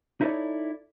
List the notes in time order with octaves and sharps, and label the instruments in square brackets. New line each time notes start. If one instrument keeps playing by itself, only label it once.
[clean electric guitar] D#4 E4 A4 B4 C#5 D5